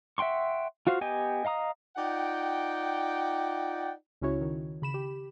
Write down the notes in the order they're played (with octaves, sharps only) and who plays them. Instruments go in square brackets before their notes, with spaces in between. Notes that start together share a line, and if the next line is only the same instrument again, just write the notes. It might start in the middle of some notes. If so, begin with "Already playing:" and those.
[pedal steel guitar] E5 F#5 G5 C6 C#6
F4 F#4 C5 F5
B3 G4 D#5 G5 G#5
D#5 F5 A#5 D#6
[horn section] D#4 F4 D5 F#5 G5
[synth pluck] C#2 C#3 C#4 E4 F#4 C#5
D#3
C#3 B5 E7
G4